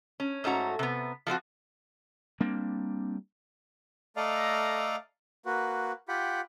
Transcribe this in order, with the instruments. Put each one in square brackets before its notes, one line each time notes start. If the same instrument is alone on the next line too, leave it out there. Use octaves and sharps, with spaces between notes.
[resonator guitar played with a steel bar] C#4
G#2 A3 C#4 F#4 A#5
C3 B3
F3 A3 C4 F#4
[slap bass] G3 A#3 C4 D4
[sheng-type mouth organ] A3 A4 D5 D#5 F5 A#5
A#3 F#4 B4
F4 G4 F#5 G5 B5